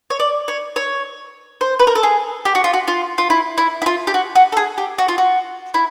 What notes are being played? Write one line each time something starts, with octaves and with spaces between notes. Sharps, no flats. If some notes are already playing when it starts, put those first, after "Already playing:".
C#5
D5
C#5
C#5
C5
B4
A#4
A4
G#4
G4
F#4
F4
F#4
F4
F4
E4
E4
E4
F4
G4
F#4
F#4
A4
G#4
G4
F#4
F4
F#4
E4